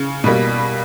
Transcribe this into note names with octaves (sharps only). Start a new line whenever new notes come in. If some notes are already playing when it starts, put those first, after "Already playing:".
Already playing: C#3
B2 G3 A#3